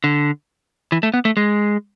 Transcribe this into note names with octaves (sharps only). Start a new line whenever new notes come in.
D3
E3
A3
B3
A3
G#3